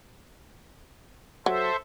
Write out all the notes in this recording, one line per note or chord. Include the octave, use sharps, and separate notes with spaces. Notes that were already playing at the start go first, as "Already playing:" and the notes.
F#3 A4 C5 E5